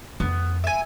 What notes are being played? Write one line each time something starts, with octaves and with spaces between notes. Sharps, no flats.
F2 B3
E5 G#5